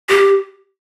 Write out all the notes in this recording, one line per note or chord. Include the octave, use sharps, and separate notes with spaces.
G4